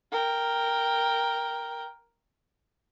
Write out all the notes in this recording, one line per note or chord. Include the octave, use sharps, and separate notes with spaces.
A#4 G5